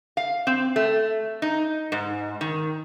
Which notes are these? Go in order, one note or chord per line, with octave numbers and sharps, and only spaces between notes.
F5
C4
A3
D#4
G#2
D#3